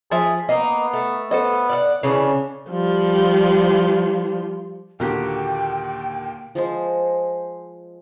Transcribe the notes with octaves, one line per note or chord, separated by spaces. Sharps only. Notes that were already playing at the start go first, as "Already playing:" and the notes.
F3 G#4 E5
A#3 B3 D#4 D#5
A3
B3 A4 C5 D#5
D5 F5 F#5
C#3 E3 C#4 D4
F3 G3
D#2 A#2 D3 A#3 F#4 G4 G5
F3 G#3 C5